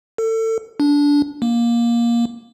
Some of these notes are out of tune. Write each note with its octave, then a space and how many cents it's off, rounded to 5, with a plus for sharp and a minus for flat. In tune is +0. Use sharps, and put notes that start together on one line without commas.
A4 +30
D4 -20
A#3 +15